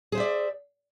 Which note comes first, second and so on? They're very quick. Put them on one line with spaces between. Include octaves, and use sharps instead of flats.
G#4 C5 E5 D5